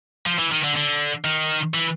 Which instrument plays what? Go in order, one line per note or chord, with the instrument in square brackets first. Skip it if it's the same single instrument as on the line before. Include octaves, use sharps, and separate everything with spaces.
[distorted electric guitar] F3
E3
D#3
D3
D3
D#3
E3